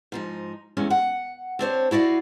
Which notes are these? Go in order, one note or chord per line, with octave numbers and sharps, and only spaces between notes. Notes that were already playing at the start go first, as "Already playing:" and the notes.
G#2 F3 D#4
E2 C3 G#3 C#4
F#5
C4 D4 C5 C#5
E4 F#4 D5 D#5 F5